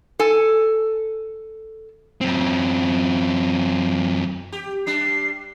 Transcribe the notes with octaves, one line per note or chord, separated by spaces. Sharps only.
A4 G#5
F#2 C4
G4
G3 D4 C7